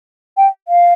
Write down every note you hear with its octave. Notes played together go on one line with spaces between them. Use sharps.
G5
F5